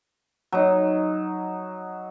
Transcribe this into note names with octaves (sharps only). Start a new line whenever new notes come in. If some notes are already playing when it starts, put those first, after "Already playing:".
F#3 D#4